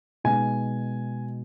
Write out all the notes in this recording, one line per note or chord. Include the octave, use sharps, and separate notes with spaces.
B2 G#3 B3 D#4 G#5